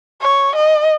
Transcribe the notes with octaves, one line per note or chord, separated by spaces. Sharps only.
C#5
D#5